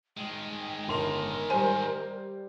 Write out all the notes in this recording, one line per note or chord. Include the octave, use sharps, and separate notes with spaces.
D#3 G#3 G5
G1 A#4 C6 F7
G3 C5 G#5